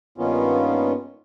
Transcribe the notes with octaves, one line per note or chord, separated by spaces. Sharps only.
G2 D#3 A#3 B3 C#4 F4